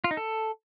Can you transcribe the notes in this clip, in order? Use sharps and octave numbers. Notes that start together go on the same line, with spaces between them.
F4
D#4
A4